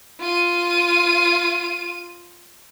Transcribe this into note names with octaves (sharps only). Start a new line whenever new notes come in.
F4 D#7